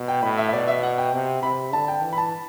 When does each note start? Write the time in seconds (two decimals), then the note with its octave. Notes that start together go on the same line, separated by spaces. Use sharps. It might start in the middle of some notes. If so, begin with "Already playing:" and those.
Already playing: B2
0.08 G5
0.22 A2 B5
0.38 E5
0.48 E5
0.53 B2 D5
0.68 E5
0.83 F#5
0.98 G5
1.13 C3
1.43 C3 B5
1.73 D3 A5
1.88 G5
2.03 E3
2.13 B5
2.18 A5